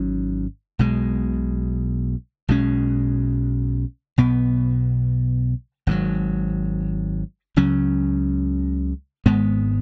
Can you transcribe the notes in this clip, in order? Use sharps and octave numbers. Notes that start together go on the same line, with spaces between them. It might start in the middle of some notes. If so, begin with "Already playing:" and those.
Already playing: G#1 G#2 F#3 C#4
B1 B2 G#3
B1 B2 G#3 C#4
B1 B2 B3
G#1 G#2 D#3 F#3
C#2 C#3 F#3 C#4
G#1 G#2 G#3 B3